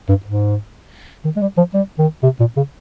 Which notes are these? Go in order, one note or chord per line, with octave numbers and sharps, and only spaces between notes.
G2
G#2
D#3
G#3
G3
F3
G3
D#3
C3
A#2
C#3